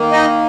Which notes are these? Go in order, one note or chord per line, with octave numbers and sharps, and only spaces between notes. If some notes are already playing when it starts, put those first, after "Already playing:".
Already playing: D#3 A#3
D#4 D#5